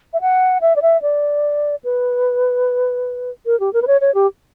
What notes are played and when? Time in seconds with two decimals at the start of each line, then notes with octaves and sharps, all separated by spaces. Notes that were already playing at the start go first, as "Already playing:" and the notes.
0.13 E5
0.21 F#5
0.61 E5
0.76 D5
0.82 E5
1.02 D5
1.84 B4
3.46 A#4
3.60 G4
3.73 A#4
3.82 B4
3.87 C#5
4.01 C#5
4.14 G4